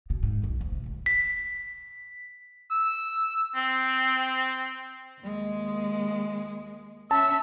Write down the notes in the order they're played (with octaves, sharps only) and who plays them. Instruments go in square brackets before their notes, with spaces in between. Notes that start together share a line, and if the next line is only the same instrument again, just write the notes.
[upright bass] B2
G#2
B1
D2
C3
C#2
[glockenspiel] B6
[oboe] E6
C4
[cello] D#2 G#3
[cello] C#4 E5 [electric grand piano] A5 [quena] E6